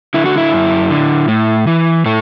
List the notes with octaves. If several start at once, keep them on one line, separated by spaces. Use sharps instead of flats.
D3 E4
F#4
E4
F#2
D3
A2
E3
A2 A3